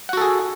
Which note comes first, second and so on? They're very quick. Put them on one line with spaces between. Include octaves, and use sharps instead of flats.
F#5 F#4 A4 G#4